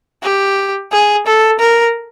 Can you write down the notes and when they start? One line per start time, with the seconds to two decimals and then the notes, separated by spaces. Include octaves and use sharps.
0.23 G4
0.92 G#4
1.26 A4
1.60 A#4